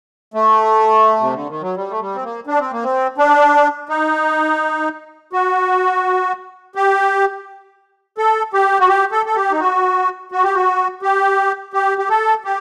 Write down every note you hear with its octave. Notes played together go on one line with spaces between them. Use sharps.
A3
C3
D3
D#3
F#3
G3
A3
G3
C4
A#3
D4
C4
A#3
C4
D4
D#4
F#4
G4
A4
G4
F#4
G4
A4
A4
G4
D#4
F#4
F#4
G4
F#4
G4
G4
G4
A4
G4